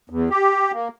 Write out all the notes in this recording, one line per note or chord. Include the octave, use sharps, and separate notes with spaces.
E2
G4
A#3